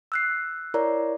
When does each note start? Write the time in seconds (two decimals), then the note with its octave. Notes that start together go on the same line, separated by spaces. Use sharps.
0.12 E6 F#6 C7
0.74 E4 A#4 C#5 D5 A#5